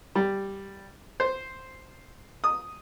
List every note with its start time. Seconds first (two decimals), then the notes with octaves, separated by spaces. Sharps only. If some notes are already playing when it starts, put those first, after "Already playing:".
0.15 G3
1.20 C5
2.44 D#6